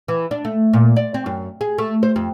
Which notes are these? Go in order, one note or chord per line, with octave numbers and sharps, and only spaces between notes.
E3
D4
A3
A#2
D5
C4
F#2
G#4
A3
C5
F2